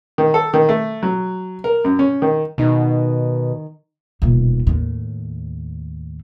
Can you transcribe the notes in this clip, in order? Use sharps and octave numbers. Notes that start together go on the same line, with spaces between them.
D#3
A4
D#3
A3
F#3
A#4
F#2
C#4
D#3
B2 D#3 D#4
D#1 B2
D#2 A2